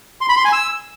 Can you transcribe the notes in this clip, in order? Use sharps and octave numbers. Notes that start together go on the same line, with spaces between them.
C6
B5
C6
G#5
E6